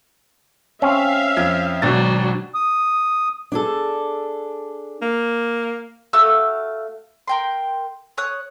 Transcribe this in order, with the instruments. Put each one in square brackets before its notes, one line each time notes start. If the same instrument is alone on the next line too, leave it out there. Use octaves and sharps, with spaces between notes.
[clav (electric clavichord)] C4 C#4 [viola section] E5 F5
[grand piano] F2 G#6
[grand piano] G#1 B2 A6 [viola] F#3 D4
[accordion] D#6
[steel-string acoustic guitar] D4 G#4 A4
[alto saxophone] A#3
[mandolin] A3 F#4 F5 E6
A#4 G5 C6
C#5 D#6 F#6